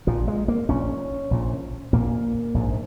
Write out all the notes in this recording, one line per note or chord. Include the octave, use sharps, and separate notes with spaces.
A#1 A#2 F3
G#3
A#3
A#1 A#2 C#4
A#1 A#2
A#1 A#2 A#3
A#1 G#2